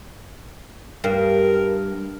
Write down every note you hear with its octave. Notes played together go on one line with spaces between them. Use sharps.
G2 A#4